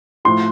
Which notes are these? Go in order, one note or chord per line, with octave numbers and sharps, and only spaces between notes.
A2 F3 C6